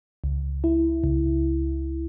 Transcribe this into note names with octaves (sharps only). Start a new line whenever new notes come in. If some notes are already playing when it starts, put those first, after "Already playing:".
C#2
E4
C#2